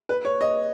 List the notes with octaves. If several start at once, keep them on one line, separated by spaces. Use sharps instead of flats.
B4
C#5
D#5